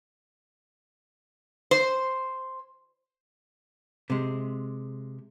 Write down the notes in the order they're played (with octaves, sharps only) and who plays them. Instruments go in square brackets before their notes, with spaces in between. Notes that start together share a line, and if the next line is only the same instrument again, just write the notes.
[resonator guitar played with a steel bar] C5
[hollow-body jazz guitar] C3 G#3